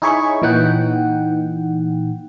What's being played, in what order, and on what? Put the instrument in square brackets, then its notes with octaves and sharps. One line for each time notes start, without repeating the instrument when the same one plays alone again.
[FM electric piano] D#4 E4 G#4 C#5 B5 C#6
A#2 E3 D#4 F#5 G5